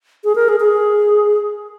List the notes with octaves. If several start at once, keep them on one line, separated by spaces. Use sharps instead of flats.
G#4
A#4
G#4
G#4